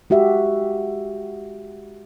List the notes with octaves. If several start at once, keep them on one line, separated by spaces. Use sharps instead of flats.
G#3 F#4 G4 E5